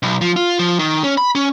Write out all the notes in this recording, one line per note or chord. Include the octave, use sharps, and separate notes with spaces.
B1
F3
F4
F3
D#3
C#4
B5
C#4